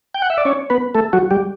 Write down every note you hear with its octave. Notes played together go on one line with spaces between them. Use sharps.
G5
F#5
E5
D5
C#4 C#5
B3 B4
A3 A4
F#3 F#4
G3 G4